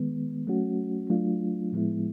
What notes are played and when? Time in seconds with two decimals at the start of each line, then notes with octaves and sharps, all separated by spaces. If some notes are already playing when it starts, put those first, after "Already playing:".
Already playing: D#3 G#3 B3
0.47 F#3 A3 C#4 F#4
1.10 F#3 A3 D4 F4
1.72 A2 F3 G#3 B3 E4